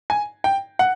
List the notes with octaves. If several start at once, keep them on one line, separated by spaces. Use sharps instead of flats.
G#5
G5
F#5